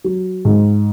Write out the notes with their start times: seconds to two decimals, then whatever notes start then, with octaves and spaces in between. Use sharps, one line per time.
0.04 F#3
0.45 G#2